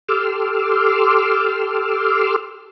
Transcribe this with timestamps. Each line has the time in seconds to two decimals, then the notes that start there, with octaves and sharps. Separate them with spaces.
0.09 G4 A4 C6 D6 E6 F6